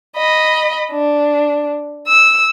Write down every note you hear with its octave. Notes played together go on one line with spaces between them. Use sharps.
D#5 B5
D4
E6